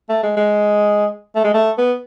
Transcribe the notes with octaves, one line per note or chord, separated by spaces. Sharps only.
A3
G#3
G#3
A3
G#3
A3
B3